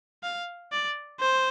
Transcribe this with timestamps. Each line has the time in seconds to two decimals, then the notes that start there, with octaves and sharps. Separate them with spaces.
0.23 F5
0.72 D5
1.20 C5